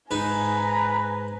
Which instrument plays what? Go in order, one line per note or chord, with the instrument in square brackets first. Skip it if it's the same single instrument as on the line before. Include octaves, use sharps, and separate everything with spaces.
[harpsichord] G#2 D#4 [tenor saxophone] B4 [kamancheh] G#5 A#5